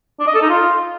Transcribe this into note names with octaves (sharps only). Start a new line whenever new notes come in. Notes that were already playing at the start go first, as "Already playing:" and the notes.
D4
D#5
A4
D#4
F4